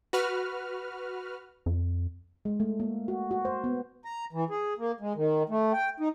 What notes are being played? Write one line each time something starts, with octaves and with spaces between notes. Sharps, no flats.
F#4 B4 F6
F2
G#3
A3
A#3
F#4
F#4
C5
B3
A#5
E3
G#4
A#3
G#3
D#3
A3
G5
D#4